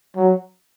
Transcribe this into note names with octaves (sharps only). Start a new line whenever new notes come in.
F#3